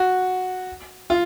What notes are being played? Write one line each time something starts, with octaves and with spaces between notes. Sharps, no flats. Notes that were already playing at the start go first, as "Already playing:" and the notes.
Already playing: F#4
F4